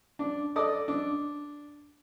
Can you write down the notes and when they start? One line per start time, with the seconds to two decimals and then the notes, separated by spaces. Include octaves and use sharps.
0.19 D4
0.56 A4 D5 D#5 D#6
0.88 D4